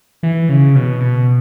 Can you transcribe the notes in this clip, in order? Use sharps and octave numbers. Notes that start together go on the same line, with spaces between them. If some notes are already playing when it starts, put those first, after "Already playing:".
E3
C#3
B2
B2